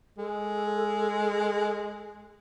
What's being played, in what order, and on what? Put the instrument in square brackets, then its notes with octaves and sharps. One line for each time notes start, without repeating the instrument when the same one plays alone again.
[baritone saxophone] G#3 [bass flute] A4